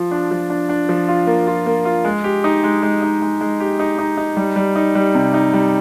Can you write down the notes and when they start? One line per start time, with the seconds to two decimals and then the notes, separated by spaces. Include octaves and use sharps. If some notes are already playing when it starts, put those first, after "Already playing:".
Already playing: F3 F4
0.11 D4
0.31 F3
0.50 D4
0.69 D4
0.89 F3
1.08 F4
1.27 A#3
1.47 F4
1.66 A#3
1.85 F4
2.05 G#3
2.24 G4
2.44 D#4
2.64 G#3
2.83 G#3
3.02 D#4
3.22 G#3
3.41 G#3
3.60 G4
3.79 D#4
3.99 D#4
4.17 D#4
4.37 G3
4.56 G3
4.76 D#4
4.95 G3
5.15 C3
5.34 D#4
5.54 G3